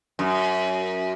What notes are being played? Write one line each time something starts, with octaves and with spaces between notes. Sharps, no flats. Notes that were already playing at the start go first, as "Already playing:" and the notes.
F#2